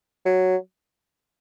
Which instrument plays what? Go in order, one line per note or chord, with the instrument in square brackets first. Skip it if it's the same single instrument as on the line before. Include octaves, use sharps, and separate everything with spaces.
[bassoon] F#3